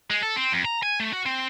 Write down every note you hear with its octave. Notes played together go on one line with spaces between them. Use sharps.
G#3
A4
C4
F2
A#5
G#5
A3
F#4
C4